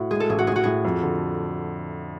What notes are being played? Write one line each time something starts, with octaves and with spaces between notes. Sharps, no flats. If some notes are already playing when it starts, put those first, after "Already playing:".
Already playing: A2 F#4
G#3 G#4
A4
A1 G#4
F#4
A2 G#4
F#4
A2 G#4
F2
D3